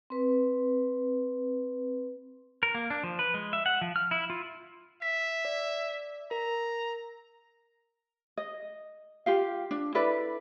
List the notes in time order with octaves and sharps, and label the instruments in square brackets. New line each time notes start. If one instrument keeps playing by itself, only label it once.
[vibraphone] C4 B4
[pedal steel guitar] A#4
A#3
D4
F3
B4
G#3
E5
F#5
F3
F6
E4
F4
[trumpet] E5 [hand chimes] B6
[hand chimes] D5
[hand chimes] A#4 [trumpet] A#5
[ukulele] D#5
F4 G4 F5
D4
E4 A4 B4 D5